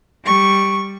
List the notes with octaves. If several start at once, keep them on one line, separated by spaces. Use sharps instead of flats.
G3 C#6